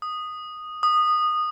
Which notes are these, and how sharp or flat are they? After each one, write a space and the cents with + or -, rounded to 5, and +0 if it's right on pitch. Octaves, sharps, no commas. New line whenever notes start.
D#6 -10
D#6 -20